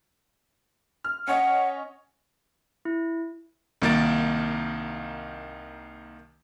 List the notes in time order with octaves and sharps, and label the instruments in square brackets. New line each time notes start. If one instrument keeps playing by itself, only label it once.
[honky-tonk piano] F6
[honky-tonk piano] C#4 C#5 D#5 [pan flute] F#5
[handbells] E4
[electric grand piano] C2 D#3 A#3 D#4 A6 D7